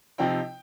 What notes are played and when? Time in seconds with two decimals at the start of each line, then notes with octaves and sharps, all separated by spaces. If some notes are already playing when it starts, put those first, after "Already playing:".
0.18 C3 F3 C4 D#4 G5